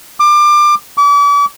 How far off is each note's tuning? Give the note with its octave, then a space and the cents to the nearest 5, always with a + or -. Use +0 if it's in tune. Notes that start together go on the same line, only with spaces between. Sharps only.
D6 +25
D6 -40